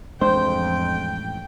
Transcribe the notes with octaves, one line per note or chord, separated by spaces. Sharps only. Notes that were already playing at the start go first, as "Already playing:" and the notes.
A1 F2 G#3 D4 C5 G5